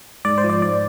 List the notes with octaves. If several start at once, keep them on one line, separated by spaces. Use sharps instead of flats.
G#2 D5
C5
F3
D5
G#2 D5